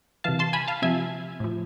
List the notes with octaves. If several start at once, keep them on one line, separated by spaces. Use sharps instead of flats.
C3 E3 F5 A5
A5 C6
G#5 B5
F5 A5
C3 F3 E5 G#5
A2 F3